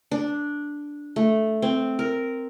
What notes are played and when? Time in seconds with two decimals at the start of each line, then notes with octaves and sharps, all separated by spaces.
0.11 D4
1.16 A3
1.62 C4
1.99 A#4